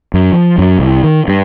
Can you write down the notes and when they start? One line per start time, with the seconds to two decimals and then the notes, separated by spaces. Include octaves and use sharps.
0.14 F#2
0.33 F3
0.58 F#2
0.79 C2
1.03 D#3
1.28 G2